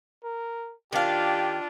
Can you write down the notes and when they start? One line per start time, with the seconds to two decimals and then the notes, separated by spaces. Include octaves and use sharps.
0.24 A#4
0.93 D#3 D4 F4 G4 F5